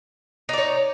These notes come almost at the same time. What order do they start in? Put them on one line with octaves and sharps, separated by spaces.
D#4 D5 C#5